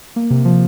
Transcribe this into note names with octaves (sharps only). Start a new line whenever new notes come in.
A#3
C3
F3